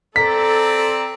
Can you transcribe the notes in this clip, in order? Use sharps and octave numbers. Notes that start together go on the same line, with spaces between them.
C4 A4 D5 A#5 B6